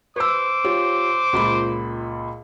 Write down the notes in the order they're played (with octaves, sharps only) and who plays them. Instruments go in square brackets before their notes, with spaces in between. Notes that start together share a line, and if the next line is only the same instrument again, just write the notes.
[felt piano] B4 E6 [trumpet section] C5 D6
[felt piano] F4 G4 C#5
C#2 A#2 B5